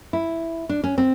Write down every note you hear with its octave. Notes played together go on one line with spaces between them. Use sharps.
E4
D4
C#4
C4